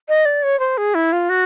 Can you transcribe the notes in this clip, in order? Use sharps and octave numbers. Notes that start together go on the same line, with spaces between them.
D#5
D5
C#5
C5
G#4
E4
F4
F#4